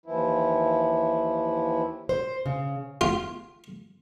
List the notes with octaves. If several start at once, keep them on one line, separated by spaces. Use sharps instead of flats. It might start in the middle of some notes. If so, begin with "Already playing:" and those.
D#2 E3 F3 E4
C5
C#3
F4